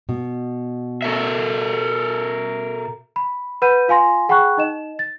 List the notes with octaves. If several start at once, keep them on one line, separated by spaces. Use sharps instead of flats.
B2
A4 A#4 E5
B5
B4 F#5 B5 G6 D#7
F4 F5 G#5 C6 A#6
G#4 F#5 G5 B5 C#6 F#6
D#4 D#5 E7
A6